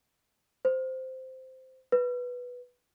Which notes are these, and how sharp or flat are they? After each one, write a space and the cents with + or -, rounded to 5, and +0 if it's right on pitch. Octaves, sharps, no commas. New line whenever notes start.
C5 -10
B4 -5